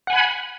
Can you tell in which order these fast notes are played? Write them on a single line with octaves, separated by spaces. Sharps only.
F#5 G#5 B5